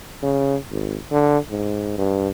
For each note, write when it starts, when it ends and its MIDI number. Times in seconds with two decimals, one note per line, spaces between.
0.23 0.56 49
0.71 0.97 32
1.12 1.38 50
1.50 1.95 44
1.98 2.29 43